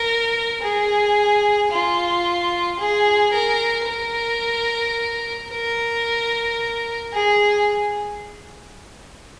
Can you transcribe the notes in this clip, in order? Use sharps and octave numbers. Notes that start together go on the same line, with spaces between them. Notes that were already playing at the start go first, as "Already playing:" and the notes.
Already playing: A#4
G#4
F4
G#4
A#4
A#4
A#4
G#4